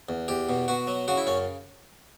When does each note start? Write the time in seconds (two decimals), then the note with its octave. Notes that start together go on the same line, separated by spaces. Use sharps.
0.09 E2
0.28 E2 G4
0.49 B2
0.68 B2 F#4
0.87 F#3
1.08 C#3 F#4
1.17 E4
1.27 F#2 C#4